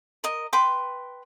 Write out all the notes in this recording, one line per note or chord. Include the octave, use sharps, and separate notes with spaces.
A#4 D#5
B4 G5 C6 D6